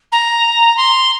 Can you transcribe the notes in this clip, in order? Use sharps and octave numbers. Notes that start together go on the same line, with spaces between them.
A#5
C6